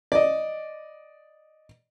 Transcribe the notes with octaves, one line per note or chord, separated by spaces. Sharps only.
D5 D#5